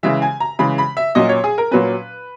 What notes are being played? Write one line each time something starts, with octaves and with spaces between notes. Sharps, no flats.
C#3 E3 G#3 E5
G#5
A#5
C#3 E3 G#3 B5
B5
E5
A#2 F#3 C#4 D#5
C#5
G#4
A#4
A#2 F#3 C#4 B4